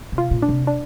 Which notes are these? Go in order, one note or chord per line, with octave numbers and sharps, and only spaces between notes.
C3
F4
A#2
D4
C3
D4